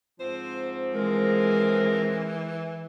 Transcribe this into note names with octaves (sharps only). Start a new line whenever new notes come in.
G#2 F3 C4 C5
E3 G#3 A#4